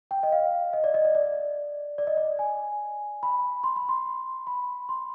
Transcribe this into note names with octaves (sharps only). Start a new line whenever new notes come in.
G5
D#5
F5
D#5
D5
D#5
D5
D5
D5
D#5
D5
G#5
B5
C6
B5
C6
B5
C6